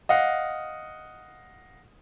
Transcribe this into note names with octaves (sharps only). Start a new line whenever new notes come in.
D#5 F5 F#5